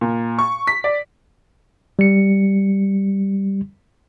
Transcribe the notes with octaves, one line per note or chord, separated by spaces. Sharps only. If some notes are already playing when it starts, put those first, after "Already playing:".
A#2
C#6
B6
D5
G3 C#7